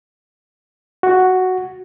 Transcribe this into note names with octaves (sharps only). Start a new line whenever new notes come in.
F#4